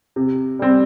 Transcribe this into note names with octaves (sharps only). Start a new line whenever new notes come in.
C3
G3 C4